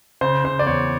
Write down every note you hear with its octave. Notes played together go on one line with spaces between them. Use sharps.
C#3 C5
C#3 C5
D5
E2 C#5